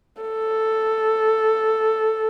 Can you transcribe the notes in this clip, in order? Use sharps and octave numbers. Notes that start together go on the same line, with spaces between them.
A4